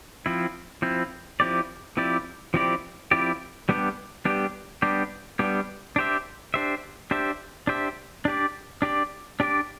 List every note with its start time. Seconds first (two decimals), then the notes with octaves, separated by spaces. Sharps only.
0.26 F3 C4 E4
0.82 F3 C4 E4
1.40 F3 C4 E4 G4 D5
1.97 F3 C4 E4 G4 D5
2.54 F3 C4 E4 G4 D5
3.11 F3 C4 E4 G4 D5
3.69 G3 B3 D4 G4
4.25 G3 B3 D4 G4
4.82 G3 B3 D4 G4
5.39 G3 B3 D4 G4
5.96 D4 G4 C5 E5
6.54 D4 G4 C5 E5
7.11 D4 G4 C5 E5
7.67 D4 G4 C5 E5
8.25 D4 G4 D5
8.82 D4 G4 D5
9.40 D4 G4 D5